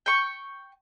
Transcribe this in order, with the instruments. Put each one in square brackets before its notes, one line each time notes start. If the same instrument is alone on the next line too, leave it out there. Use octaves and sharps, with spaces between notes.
[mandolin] G5 C#6